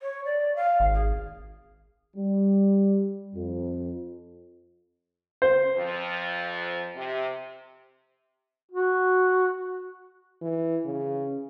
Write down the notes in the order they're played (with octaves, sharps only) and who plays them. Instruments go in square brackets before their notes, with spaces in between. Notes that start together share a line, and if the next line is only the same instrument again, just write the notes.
[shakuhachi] C#5
D5
F5
[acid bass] G#1
[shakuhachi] G#4
[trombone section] G3
F2
[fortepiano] C5
[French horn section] F2 F3
C3
[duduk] F#4
[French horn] E3
C#3